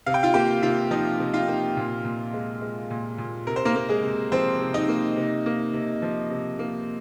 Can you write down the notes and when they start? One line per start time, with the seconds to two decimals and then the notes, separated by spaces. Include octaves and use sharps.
0.06 C3 F5
0.14 G5
0.23 F4 F5
0.34 A#3 G4 G5
0.62 C3 F4 F5
0.91 F3 D#4 D#5
1.19 C3
1.34 F4 F5
1.48 A#3
1.77 A#2
2.04 A#2
2.33 G#3
2.61 G#3
2.90 A#2
3.18 A#2
3.46 C3 A#4
3.56 C5
3.65 A#3 A#4
3.75 A#3
3.89 G#3 G#4
4.03 C3
4.32 F3 C4 C5
4.60 C3
4.74 D#4 D#5
4.88 A#3
5.16 C3
5.46 A#3
5.73 C3
6.02 F3
6.30 C3
6.59 A#3